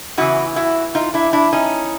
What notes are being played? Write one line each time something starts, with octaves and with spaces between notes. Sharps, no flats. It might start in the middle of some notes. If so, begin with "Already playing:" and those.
E2 C#3 E3 E4 F#4
E4 F#4
D#4 F4
D4 E4
D4 E4
C#4 D#4